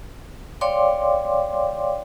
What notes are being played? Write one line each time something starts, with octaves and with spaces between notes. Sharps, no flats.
C#5 D5 F5 G5 C6 D6